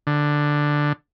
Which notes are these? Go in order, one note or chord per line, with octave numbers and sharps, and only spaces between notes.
D3